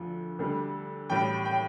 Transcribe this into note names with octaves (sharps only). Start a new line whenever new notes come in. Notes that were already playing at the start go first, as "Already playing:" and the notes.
Already playing: D2 D3 F3
D2 D3 G3
A1 A2 G3 G5
G5